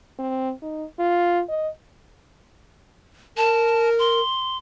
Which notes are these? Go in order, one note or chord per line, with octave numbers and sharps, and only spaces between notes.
C4
D#4
F4
D#5
A#4 A5
C6